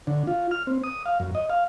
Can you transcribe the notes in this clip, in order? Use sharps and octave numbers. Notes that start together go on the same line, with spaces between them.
D3
F4
F6
C4
D#6
F5
F#2
D#5
F5